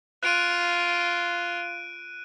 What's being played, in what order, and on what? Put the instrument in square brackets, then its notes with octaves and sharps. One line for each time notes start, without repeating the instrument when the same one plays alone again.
[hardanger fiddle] F4 [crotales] F#6 D7 D#7